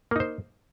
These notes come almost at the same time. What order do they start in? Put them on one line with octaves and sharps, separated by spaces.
A#3 D#4 C5